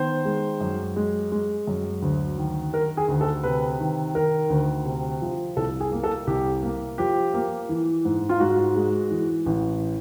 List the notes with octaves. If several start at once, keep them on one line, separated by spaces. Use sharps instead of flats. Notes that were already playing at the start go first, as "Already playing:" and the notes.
Already playing: D#3 B3 C5
G#3
F#2
G#3
G#3
F#2
D2
D#3
D#3 A#4
G#4
D2
A4
C3 B4
D#3
D#3 A#4
D2
C3
F3
C2 A4
G#4
A#3
A4
C2 G4
A#3
F3 G4
A#3
E3
G#2
F4
G#2 F#4
G#3
E3
A1